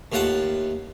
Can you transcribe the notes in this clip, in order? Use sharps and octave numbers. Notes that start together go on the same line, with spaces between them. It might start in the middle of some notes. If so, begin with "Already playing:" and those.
D#2 A2 F4 F#5 A5